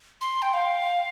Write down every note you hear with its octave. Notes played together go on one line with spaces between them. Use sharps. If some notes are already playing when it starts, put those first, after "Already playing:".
C6
G5
F5